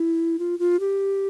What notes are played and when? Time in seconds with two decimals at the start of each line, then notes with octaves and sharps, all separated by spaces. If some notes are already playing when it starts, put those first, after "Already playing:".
Already playing: E4
0.39 F4
0.59 F4
0.80 G4